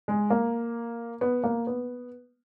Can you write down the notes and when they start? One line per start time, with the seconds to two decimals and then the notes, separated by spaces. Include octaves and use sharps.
0.08 G#3
0.30 A#3
1.21 B3
1.44 A#3
1.67 B3